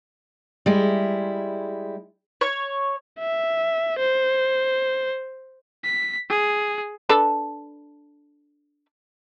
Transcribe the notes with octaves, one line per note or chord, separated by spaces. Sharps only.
G3 G#3 E4
C#5
E5
C5
B6
G#4
D4 A4 B4